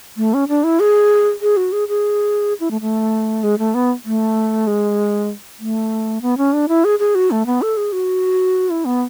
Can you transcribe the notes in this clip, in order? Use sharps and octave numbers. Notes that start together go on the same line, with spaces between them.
A3
C#4
D4
E4
G#4
G#4
F#4
G#4
G#4
E4
A3
A3
G#3
A3
B3
A3
G#3
A3
B3
C#4
D4
E4
G#4
G#4
F#4
A3
B3
A4
G#4
F#4
E4
B3